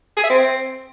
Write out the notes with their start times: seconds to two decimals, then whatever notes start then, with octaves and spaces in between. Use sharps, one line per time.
0.17 G#4
0.23 E5
0.30 C4